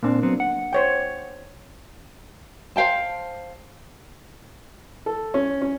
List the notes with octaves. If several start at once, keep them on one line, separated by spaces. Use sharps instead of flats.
A#2 A#3 C4 D4
F#3 B3 C4
F#5
C5 C#5 G5
C5 F5 G5 A5
A4
C#4
C#4